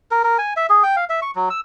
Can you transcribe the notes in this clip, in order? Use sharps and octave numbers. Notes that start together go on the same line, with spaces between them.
A#4
A#4
G#5
E5
G#4
G5
F5
E5
C#6
F#3
E6